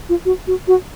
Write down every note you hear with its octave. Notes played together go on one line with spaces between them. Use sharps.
F4
F#4
F#4
F#4